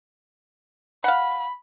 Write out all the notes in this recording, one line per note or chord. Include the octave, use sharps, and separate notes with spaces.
F5 F#5 B5